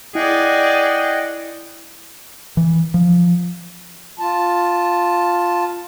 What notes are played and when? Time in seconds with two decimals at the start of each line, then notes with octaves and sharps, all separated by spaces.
0.15 E4 G#4 D5 D#5 F#5 G5
2.57 E3
2.94 F3
4.19 F4 A5